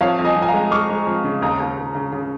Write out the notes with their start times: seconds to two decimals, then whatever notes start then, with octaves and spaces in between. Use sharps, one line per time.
0.01 F2 C#5 F5
0.19 F2
0.24 D#5 G#5
0.36 F2
0.42 G#5
0.48 F5 A#5
0.54 G#3
0.71 G#3 C#6 F6
0.89 G#3
1.07 F2
1.24 C#3
1.42 D#2 A#5 D#6
1.60 D#2
1.77 D#2
1.95 C#3
2.12 C#3